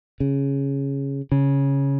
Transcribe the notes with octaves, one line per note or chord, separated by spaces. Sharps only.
C#3
C#3